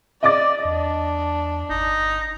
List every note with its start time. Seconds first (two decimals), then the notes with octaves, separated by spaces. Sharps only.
0.23 D5 D#5 D6 A6
0.65 E2 D4
1.70 G1 D#4